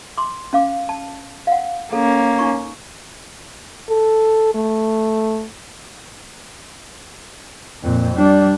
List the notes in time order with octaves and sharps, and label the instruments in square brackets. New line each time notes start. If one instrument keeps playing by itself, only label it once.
[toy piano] C6 D6
C#4 F5 D6
A5
F5 F#5
[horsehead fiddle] A#3 C#4 [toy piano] A4
[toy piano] D#4 C#6
[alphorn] A4
A3
[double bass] F2 A#2
G3 D4